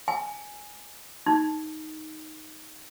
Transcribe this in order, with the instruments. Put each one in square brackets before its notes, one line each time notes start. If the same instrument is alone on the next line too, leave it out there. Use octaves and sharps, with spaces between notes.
[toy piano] G#5
D#4